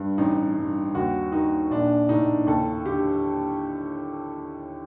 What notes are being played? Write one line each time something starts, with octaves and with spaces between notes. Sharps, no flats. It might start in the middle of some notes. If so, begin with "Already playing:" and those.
Already playing: G2
A1 D#4
G2
D#2 F#4
D#3 D#4
A#1 D4
A2 D#4
D#2 A4
D3 G4